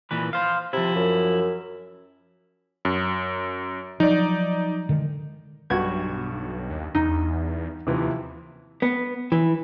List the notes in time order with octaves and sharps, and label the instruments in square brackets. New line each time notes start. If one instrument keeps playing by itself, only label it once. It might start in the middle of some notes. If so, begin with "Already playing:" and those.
[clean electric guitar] A#2 E3 B4
C5 F5
[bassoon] C3 [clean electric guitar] F3 E4
[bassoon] F#2
[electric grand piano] F#2
[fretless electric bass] F3 F#3 [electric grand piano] D#4 D5
[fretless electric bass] D3 D#3 G#3
[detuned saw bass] B1 [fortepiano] G2 F#4 [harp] G#6
[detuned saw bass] D#2
[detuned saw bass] E2 [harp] D#4
[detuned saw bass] D#2 [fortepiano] C3 E3 F3
[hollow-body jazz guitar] B3
E3